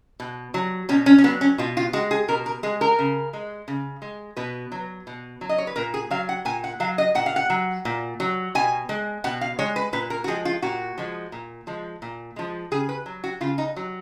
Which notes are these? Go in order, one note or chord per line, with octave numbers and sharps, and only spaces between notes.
B2
F#3
B2 C#4
C#4
C#4
F#3 B3
C#4
B2 F4
F4
G#3 F#4
G#4
B2 A#4
A#4
G#3 G#4
A#4
C#3
G#3
C#3
G#3
B2 B4
F#3
B2
F#3
D#5
C#5
B4
A#2 A#4
G#4
F#3 F5
F#5
A#2 G#5
F#5
F#3 F5
D#5
A#2 F#5
F5
F#5
F#3
A#2
F#3
B2 G#5
G#3
B2 F#5
F5
G#3 C#5
B4
A#2 B4
A#4
F#4
F3 G#3 G#4
F4
A#2 F#4
F3 G#3
A#2
F3 G#3
A#2
F3 G#3
C#3 G#4
B4
F#3
F#4
C#3 F4
D#4
F#3